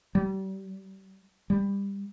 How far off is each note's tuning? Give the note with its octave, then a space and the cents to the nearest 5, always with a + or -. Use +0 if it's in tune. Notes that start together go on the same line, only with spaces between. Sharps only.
G3 -35
G3 +20